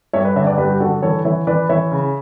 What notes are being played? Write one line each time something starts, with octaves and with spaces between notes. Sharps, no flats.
G2 C#5 E5
B4 D5
D3 C#5 E5
B4 D5
G2 G4 B4
G4
D3 F#4 A4
E3 A4 C#5
E3 C#5 E5
E3 B4 D5
E3 C#5 E5
C#3